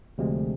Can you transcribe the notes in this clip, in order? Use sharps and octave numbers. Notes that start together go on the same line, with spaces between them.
D2 C3 F3 G#3